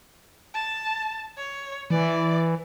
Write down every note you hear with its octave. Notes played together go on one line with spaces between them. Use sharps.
A5
C#5
E3 D5